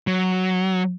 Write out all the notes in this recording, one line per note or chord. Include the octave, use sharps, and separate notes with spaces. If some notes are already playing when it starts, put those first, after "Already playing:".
F#3